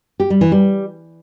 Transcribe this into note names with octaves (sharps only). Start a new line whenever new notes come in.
G4
G3
E3
G3